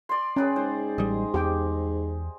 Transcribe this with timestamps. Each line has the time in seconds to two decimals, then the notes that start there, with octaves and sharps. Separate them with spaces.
0.09 D5 C6
0.36 C#4 G#4 B4 G5
0.56 G#2 C5
0.98 A1 G3 D#5
1.34 E2 G4 G5